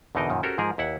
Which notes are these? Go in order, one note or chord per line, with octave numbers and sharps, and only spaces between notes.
E2 B2 D3 D#4 A#4 D#5
F#2 A#2 D#3
C#4 F#4 G4 A4 A#4 C5
G#2 F3 G#4 A#4
D#2 E4 F#5